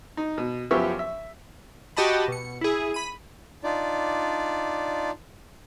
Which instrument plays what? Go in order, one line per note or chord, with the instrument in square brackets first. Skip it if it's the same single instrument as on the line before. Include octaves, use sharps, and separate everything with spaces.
[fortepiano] D#4
B2
F#2 F3 B3 G4 E5 C#6
E5
[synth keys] F#4 G4 D#5 A5 B5
B2 C#7
E4 G#4
B5 D#7
[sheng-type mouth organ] D4 D#4 F4 D5